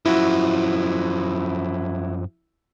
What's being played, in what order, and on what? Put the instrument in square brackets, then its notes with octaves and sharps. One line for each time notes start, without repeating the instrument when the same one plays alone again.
[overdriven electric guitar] F#2 F3 [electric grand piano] E4 F#4